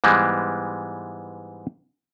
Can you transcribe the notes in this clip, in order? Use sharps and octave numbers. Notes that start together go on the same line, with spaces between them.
G#2 E3 G3 G#3 B3